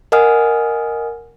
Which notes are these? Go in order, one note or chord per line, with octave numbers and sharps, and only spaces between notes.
A#4 D#5 F#5 G#5 D#6 F6